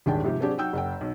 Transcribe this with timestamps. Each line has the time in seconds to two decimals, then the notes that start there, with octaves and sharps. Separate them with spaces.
0.06 D#1 G#1 D4 G#4 G5 A5
0.23 G#2 C3 F3 G4
0.40 F#3 C4 D4 G4 G#4
0.57 F#3 D#4 F#5 G5 E6 G6
0.73 F#1 F#5 G5
1.01 B1